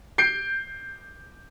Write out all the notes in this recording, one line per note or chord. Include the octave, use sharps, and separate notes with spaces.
G6 C7 D7